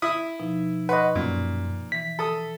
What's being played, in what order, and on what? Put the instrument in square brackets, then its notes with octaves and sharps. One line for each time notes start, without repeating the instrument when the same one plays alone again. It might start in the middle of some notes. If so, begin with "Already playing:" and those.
[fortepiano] E4 E5 D#6
[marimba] B2 F3 D#4
[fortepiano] B4 [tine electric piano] D#5 F#5 [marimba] C6 C#6
[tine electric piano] F#2 [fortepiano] A#2
[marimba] E3 [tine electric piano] B6
[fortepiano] A4 D#6